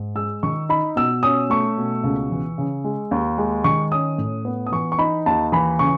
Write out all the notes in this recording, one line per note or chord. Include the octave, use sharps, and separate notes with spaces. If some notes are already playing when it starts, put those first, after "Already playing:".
Already playing: G#2
G#3 E6
D#3 C#6
D#4 B5
B2 E6
C#4 D#6
A3 C#6
B2
C#2
E3
C#3
G#3
D#2
G#3
D#3 C#6
C#4 D#6
A2
B3
D#6
E3 C#6
C#6
D#4 B5
D#2 A5
E3 B5
C#3 C#6